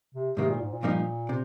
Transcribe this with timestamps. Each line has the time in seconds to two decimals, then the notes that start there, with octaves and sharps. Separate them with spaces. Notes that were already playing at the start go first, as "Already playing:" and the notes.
0.14 C3
0.37 G#2 C3 D#3 A#3
0.50 A#2
0.61 G#2
0.72 A#2
0.83 G2 F3 A#3 D#4
1.29 C3